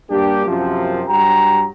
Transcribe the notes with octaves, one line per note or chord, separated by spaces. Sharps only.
G2 A#3 D4 G4
F#2 C3 F3
G2 F#3 G5 A#5